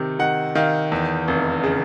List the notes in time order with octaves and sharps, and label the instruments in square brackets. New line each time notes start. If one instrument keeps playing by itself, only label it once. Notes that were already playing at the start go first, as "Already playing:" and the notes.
Already playing: [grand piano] C3 D#3
D#3 F#5
D#3 F5
E2
F1
C#3